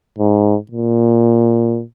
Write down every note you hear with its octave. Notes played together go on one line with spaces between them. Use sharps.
G#2
A#2